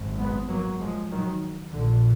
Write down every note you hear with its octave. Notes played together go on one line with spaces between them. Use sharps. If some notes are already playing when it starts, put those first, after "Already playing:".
Already playing: G#1 F#2
G#3 B3
F#3 A#3
F3 G#3
D#3 F#3
A#1 A#2 D3